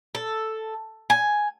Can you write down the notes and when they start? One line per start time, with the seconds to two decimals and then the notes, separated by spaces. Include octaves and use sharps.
0.15 A4
1.10 G#5